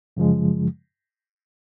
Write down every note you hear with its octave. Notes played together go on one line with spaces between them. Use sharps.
F#2 C#3 F3 G#3